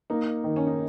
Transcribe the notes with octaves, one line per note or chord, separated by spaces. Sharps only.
A#3 D#4
D#3
C#4
D#4